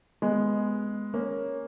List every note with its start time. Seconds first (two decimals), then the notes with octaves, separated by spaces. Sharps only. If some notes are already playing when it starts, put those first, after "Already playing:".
0.22 G#3 B3
1.14 A#3 C#4